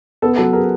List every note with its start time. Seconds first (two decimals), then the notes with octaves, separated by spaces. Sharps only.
0.22 B3 A4
0.37 F#3 A4 B4
0.53 G#4 A#4